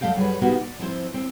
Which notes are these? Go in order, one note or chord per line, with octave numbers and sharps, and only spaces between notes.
F#2 F#3 A3 D#5 F5 G5
F#2 G3 G#4 B4 C#5
C3 A#3 B3 D#4 F#4 G4
D5
F3 C4 E4 C5
C4